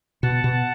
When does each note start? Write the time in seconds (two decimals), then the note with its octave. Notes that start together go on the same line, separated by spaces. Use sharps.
0.23 B2 F#5 A5
0.44 B2